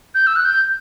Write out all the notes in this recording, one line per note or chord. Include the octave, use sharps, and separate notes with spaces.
G6
E6
F#6
G6